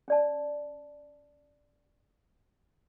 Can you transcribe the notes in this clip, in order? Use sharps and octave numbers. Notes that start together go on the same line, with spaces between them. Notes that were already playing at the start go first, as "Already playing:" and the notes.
C#4 D5 A5